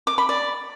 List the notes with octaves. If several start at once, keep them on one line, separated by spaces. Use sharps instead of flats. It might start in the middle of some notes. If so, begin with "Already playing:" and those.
D6
B5
D5